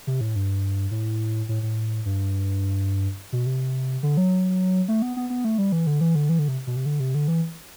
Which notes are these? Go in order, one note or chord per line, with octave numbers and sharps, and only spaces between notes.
C3
A2
G2
A2
A2
A2
G2
B2
C3
D3
F#3
A3
B3
B3
B3
A3
G3
E3
D3
E3
D3
E3
D3
C3
B2
C3
D3
C3
D3
E3